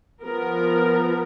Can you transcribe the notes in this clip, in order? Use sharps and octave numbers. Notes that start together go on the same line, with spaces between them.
F3 B3 A#4